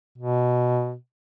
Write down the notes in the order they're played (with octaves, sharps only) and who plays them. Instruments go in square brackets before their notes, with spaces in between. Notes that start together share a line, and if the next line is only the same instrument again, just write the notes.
[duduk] B2